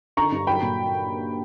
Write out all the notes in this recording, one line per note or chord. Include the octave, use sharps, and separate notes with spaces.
D3 A#5 C#6
G2
F#3 G5 B5
A#2